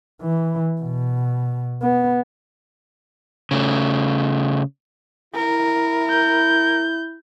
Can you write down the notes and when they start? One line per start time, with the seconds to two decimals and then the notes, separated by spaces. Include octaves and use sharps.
0.22 E3
0.81 B2
1.82 B3
3.51 C#3 A3
5.35 E4 A#4
6.10 G6